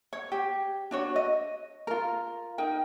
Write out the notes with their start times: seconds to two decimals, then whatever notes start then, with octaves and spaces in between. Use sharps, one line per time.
0.13 C#5
0.32 G4
0.91 D4 F#4 C#5
1.16 D#5
1.87 F4 A#4
2.58 D#4 A#4 G5